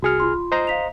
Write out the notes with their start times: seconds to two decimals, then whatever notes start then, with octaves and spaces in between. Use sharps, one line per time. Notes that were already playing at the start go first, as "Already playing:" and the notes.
0.02 C2 F#4 G#4 F6 C#7
0.20 F4 C6
0.52 C5 D#5 A#5
0.67 F5 B6 F7